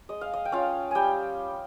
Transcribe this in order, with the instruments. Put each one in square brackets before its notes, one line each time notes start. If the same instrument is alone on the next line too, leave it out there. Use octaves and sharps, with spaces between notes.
[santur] G#3 D#5
F5
D#5
G5
C#4 F4 F5
G3 G5 G#5